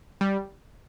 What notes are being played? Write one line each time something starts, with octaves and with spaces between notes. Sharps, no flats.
G3